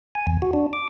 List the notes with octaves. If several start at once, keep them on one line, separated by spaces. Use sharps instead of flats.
G#5
E2
F#4
D4
D6